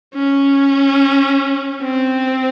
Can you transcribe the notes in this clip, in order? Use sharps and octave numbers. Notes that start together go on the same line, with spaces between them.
C#4
C4